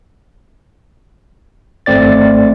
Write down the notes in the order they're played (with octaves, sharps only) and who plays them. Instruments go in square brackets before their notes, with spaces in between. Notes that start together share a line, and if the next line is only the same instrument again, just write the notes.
[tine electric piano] G#1 A3 C4 D5 A6